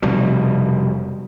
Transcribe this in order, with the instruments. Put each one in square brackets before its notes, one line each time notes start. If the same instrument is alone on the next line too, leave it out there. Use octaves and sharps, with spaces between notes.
[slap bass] F1 B2 G3